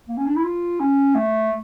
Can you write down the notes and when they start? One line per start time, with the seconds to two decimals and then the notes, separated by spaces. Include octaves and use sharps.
0.08 A#3
0.17 C#4
0.27 D4
0.36 E4
0.44 F4
0.80 C#4
1.15 A3